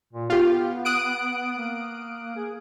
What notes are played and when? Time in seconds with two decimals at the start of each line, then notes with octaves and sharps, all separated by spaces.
0.13 A#2
0.30 B3 F4 G4
0.85 D#6 F#6 D7
1.58 A#3
2.36 G#4